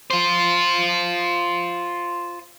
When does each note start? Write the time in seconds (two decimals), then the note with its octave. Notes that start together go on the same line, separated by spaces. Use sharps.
0.10 F4 C5